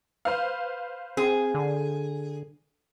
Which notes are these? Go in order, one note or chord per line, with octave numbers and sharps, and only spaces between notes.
B4 C5 F5
C4 G#4
D3